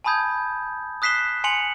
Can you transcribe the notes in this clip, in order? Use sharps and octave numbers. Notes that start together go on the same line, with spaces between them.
G#5 A5 B5 D#6 G6 G#6
D#6 F#6 B6 C7 E7 G7
G#5 C6 C#7 F7 F#7